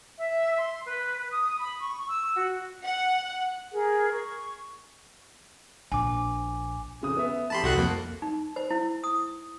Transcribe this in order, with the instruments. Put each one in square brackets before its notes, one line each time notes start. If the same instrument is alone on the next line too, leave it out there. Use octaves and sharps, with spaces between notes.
[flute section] E5
C6
B4
D#6
B5
C#6
E6
F#4
[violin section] F#5
[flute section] G#4 A#4
C#6
[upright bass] A#1 [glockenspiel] G#5 D6
[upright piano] F1 C#3 D#6
B3 E5
[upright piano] F1 G4 [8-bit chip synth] A5 B5 C6
[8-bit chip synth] C2 F#4 F#6 [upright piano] A4
[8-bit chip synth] F2 A#3
[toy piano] D#4
C5
E4
D#6